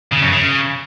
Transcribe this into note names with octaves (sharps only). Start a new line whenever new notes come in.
C#3
F#2
C#3